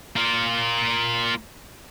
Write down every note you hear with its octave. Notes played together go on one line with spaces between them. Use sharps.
A#3 F4